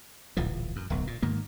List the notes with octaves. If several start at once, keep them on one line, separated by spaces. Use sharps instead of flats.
D1 A#1 E3 F3
F#2
D1 B1
A#2
G#2 D#3 A#3